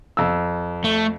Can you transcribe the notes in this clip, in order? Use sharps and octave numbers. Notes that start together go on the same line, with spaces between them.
F2 E6
A3